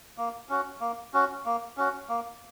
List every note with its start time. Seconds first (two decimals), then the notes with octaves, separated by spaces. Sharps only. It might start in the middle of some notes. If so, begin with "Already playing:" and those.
0.18 A#3
0.49 C#4 F#4
0.81 A#3
1.14 C#4 F#4
1.45 A#3
1.77 C#4 F#4
2.09 A#3